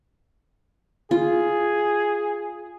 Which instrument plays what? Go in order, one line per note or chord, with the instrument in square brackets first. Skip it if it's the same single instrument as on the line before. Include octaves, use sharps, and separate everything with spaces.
[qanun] F4 [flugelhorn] G#4